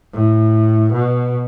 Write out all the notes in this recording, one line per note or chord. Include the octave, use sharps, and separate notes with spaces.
A2
B2